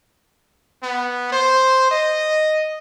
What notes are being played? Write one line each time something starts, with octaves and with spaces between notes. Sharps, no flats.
B3
C5
D#5